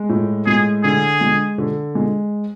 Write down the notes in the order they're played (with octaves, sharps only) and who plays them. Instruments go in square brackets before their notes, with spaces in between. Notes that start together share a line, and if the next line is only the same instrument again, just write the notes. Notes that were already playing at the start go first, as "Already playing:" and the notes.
Already playing: [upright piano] G#3
A2
[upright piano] G#3 [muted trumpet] G#4
[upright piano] D3 [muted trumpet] G#4
[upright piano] G#3
D3
G#3